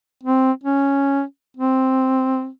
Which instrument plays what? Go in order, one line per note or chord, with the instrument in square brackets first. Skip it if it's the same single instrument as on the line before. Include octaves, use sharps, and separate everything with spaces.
[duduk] C4
C#4
C4